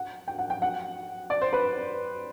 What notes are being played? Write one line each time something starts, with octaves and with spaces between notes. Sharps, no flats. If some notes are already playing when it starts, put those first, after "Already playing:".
Already playing: F#5
G5
F#5
G5
F#5
D5
C5
B4